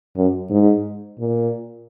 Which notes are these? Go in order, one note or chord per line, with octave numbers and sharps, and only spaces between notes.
F#2
G#2
A#2